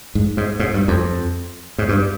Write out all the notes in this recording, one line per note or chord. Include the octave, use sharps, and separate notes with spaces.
G#2
G#2
G#2
G2
F2
G#2
G2